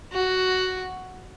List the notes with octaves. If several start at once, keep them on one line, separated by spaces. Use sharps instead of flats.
F#4